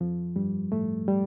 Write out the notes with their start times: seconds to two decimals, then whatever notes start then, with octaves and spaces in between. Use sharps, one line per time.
0.01 F2 F3
0.36 G2 G3
0.72 A2 A3
1.08 G3